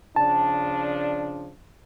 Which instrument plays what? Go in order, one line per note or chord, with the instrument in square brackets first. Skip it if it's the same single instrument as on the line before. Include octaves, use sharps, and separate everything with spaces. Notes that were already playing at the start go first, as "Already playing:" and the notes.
[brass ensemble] C#3 F3 D4 [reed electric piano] A5